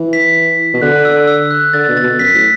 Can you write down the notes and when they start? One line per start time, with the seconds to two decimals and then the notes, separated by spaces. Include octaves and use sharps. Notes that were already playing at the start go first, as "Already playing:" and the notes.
Already playing: E3
0.13 B6
0.74 B2
0.82 D3 F#6
1.05 E6
1.27 E6
1.51 F#6
1.73 D3 A6
1.89 B2
1.97 A6
2.04 B2
2.19 F#2 B6
2.34 A2